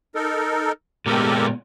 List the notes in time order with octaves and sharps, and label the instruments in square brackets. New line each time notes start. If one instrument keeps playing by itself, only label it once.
[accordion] D#4 A4 A#4
[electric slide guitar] A#2 G#3 B3 [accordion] G4 A4 A#4